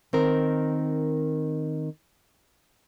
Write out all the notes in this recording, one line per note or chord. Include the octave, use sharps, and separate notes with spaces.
D#3 C4 A#4